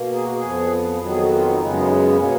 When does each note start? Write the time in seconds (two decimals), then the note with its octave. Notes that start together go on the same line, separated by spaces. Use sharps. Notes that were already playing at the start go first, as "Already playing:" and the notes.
Already playing: B2 A#3
0.13 G#4
0.23 F#4
0.36 G#4
0.42 F2 F3 B3
1.00 F2 D#3 F#3 B3
1.09 G#4
1.22 F#4
1.34 F4
1.46 D#4
1.58 F#2 C#3 G#3 B3 C#4
1.73 D#4
1.81 F4
1.87 D#4
2.03 F4
2.17 B2 A#3 C#4